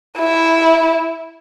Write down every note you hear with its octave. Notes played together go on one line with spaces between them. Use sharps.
E4